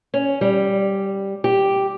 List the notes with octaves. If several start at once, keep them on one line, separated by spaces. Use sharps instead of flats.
C#4
G3
G4